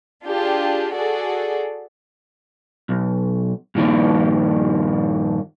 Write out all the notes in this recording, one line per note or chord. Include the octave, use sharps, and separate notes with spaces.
D4 F4 G4 G#4
F#4 G#4 A4 D5
B1
G2 A#2 D#3 F3 A#3